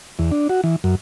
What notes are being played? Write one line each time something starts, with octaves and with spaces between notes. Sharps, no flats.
E2
D4
F#4
E3
F#2